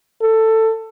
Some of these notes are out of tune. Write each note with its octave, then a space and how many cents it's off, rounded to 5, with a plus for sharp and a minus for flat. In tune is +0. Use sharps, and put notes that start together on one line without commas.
A4 +15